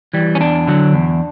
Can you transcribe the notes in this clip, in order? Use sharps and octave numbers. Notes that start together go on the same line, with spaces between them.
E3 G3
C#4
E2 D4
D3 F#3
E2